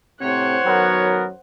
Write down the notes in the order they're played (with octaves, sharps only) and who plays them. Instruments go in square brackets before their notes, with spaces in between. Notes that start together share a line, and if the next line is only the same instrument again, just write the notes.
[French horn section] A2 C3 C4 [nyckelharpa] C5 F#5 [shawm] C#5
[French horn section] F#2 D#3 F#3 [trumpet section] B3 A#4